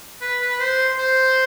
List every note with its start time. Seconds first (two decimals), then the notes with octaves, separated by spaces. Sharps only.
0.22 B4
0.41 B4
0.59 C5
0.98 C5